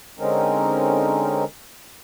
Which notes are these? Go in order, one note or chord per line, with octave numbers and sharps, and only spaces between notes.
D3 G#3 C4 C#4 D#4 A#4